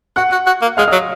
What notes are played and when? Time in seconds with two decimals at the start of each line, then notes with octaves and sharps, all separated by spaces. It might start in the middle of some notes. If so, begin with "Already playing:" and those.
0.16 F#4 F#5 F#6
0.32 F#4
0.46 F#4
0.62 A#3
0.77 G#3 F5 F6
0.88 D#5 D#6
0.92 F#3